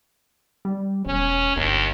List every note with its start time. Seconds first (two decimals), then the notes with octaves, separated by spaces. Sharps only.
0.65 G3
1.06 E1 C#4
1.56 G1 D#2